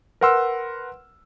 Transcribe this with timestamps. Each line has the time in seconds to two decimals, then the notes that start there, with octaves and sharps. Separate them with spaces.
0.21 A#4 B4 F#5 C6 E6 F6